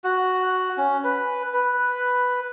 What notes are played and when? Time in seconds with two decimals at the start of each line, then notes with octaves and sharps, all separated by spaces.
0.04 F#4
0.78 C#4
1.04 B4
1.53 B4